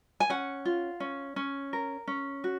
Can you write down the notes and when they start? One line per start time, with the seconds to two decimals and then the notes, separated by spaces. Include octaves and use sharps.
0.20 G#5
0.30 C#4 F#5
0.65 F4
1.00 C#4
1.36 C#4
1.73 A#4
2.07 C#4
2.44 F#4